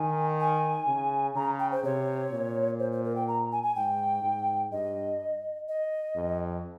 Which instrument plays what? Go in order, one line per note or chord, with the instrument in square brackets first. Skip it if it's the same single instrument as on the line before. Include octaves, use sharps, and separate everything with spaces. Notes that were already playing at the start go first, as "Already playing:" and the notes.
Already playing: [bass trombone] D#3 [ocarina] G#5
[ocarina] G#5
[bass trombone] C#3
[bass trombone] C#3 [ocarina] A#5
[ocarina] G5
C5
[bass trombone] C3 [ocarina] C#5
[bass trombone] A#2
[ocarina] C5
C5
A#4
G5
A#5
G#5
G#5
[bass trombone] G#2 [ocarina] G5
[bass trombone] G#2
[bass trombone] G2 [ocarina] D#5
[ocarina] D#5
[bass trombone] F2